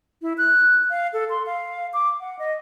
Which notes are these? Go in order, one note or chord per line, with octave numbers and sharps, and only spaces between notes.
E4
F#6
F5
A4
C6
F5
D6
F#5
D#5